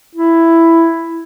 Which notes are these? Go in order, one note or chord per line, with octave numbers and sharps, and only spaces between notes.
E4